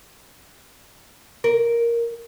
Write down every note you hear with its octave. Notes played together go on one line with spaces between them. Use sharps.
A#4